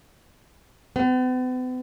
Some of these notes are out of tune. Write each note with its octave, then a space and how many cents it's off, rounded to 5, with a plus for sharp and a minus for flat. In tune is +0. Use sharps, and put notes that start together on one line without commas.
B3 +45